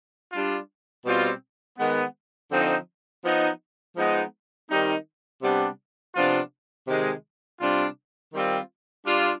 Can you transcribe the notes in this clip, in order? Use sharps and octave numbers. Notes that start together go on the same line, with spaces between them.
G3 D4 F4
B2 G3 C4 F4
D#3 G#3 B3
D3 F3 C4 D#4
F3 B3 D#4
F3 G#3 B3 D#4
D#3 G3 C4 D#4
C3 G3 B3 D4
C3 F3 B3 D4 F4
C3 D#3 G#3
C3 G3 D4 F4
D#3 G3 C4 F4
G3 D4 F4